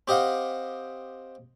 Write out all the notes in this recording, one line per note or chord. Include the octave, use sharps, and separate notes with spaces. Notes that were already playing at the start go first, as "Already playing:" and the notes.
C4 G4 D#5 F5 F#5